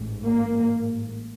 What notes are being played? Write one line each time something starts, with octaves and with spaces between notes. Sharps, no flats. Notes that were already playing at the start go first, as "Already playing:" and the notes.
Already playing: A1 G#2
A#3